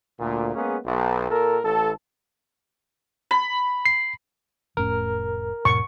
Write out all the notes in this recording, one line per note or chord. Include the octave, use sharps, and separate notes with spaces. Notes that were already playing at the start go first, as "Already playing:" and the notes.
D2 A#2
G#3 A#3 B3 C#4 G#4
B1
A#2 A4 A#4
A1 A4
B5
C7
F1 A2 C#4 A#4
E1 G#2 B2 C#6